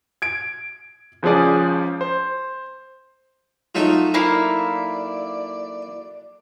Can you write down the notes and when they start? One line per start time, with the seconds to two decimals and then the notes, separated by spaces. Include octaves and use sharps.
0.22 G#6 D7
1.23 C#2 F3 C#4 G#4 D5
2.01 C5
3.75 F#3 A3 D#4 F4
4.14 A#3 E4 D5 F5